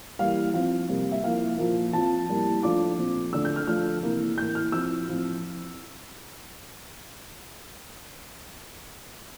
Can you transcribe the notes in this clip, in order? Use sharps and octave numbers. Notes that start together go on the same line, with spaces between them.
E3 G3 A#3 F5
F3 C4 F4 F5
C3 G3 A#3
E5
F3 A#3 E4 F5
A#2 F3 A#3
F3 C4 F4 A5
A2 G3 A#3 E4
F3 A3 D4 F4 D6
A#2 F3 C4
D3 A3 D4 F4 E6
G6
F6
F3 A3 D4 F4 F6
C3 E3 A#3 E4
A2 E3 A#3 G6
F6
F3 C4 E4 E6
A2 F3 C4 F4